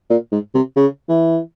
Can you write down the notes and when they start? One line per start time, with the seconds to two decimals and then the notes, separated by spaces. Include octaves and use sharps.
0.10 A#2
0.32 G#2
0.55 C3
0.76 C#3
1.09 E3